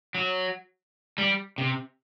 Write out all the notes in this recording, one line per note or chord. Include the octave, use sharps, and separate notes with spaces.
F#3
G3
C3